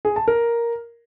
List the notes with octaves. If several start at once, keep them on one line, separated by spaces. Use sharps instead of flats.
G#4
A5
A#4